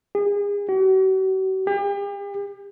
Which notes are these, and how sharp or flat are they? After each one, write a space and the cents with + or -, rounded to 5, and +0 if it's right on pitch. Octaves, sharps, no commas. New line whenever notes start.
G#4 -35
F#4 +45
G4 +40